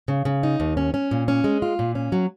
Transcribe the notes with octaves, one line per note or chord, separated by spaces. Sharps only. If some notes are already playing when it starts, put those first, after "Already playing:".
C#3
C#3
D#4
D#2
C#4
C#4
A#2
C#4
G#3
F4
A#2
C#4
F#3